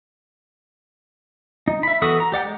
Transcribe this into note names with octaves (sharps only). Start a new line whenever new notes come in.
D#4
E5 B5
E3 B3 F#4 A4 D#6
A#5
G4 D5 F#5 G5
G#3